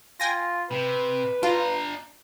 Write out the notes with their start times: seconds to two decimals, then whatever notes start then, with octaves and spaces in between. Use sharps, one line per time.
0.20 F4 G5 G#5 A#6
0.71 C3 B4
1.43 D4 F4 A#5